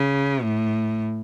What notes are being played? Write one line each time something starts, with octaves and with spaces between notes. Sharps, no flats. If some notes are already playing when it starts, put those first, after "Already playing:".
Already playing: C#3
A2